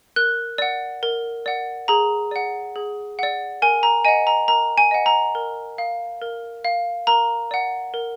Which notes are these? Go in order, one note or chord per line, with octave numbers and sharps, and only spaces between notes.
A#4 F#6
D5 F#5
A#4
D5 F#5
G#4 A#5
D5 F#5
G#4
D5 F#5
A#4 G#5
A#5
D#5 F#5 G#5
A#5
A#4 A#5
G#5
D#5 F#5
A#5
A#4
F5
A#4
F5
A#4 A#5
D5 F#5
A#4